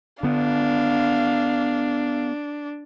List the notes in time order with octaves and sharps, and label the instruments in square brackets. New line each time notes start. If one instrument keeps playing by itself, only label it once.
[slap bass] D3 B3 [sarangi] D4 [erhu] F5